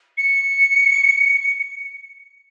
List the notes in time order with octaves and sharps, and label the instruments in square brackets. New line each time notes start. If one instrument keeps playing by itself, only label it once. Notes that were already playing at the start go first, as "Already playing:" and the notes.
[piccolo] C#7